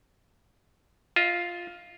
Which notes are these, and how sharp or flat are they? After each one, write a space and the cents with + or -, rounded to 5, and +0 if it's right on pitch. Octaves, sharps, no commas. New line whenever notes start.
F4 +0 D#5 +40